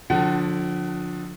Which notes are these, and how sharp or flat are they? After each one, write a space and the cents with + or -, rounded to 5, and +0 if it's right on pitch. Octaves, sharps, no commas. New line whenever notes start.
D3 -10 F3 +30 F#5 +35